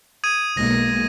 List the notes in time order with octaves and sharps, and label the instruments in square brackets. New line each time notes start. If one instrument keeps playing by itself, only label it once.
[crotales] D#6 G#6 D#7
[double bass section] B1 G#3 A#3 [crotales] A#6